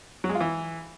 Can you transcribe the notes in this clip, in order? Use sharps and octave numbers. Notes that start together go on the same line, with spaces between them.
F#3
G#3
F4
E3